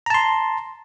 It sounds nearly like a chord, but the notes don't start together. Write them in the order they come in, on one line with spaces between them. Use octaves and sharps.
A#5 A5 C6